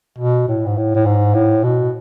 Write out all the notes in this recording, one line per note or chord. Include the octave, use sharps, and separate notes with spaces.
B2
A2
G#2
A2
A2
G#2
A2
B2